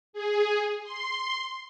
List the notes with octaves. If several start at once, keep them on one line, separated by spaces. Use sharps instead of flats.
G#4
C6